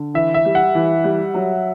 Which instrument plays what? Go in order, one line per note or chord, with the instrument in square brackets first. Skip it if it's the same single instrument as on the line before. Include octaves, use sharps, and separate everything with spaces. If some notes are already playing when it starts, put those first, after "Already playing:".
Already playing: [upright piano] D3
[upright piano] E3 [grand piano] E5
[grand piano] E5
[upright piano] G3
[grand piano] F#5
[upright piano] E3
G3
F#3